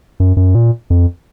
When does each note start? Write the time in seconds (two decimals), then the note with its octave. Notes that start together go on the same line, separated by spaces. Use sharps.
0.20 F#2
0.37 F#2
0.55 A#2
0.90 F2